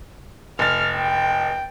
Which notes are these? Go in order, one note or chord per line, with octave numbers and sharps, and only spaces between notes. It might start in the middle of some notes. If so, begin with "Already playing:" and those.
F1 F6 A6
G5